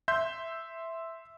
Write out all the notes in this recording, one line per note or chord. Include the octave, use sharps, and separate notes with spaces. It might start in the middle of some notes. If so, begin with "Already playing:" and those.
E5 C6 G6